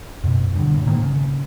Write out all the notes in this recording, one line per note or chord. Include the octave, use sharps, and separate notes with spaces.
F#2 B2
G2 D3
A2
G#2 D#3 A#3
C#3